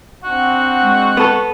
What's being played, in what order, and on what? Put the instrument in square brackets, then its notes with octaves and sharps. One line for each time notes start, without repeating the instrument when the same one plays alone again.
[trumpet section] C4 D4 F#5 [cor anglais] F#4
[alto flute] G#3
[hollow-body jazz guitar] B3 A4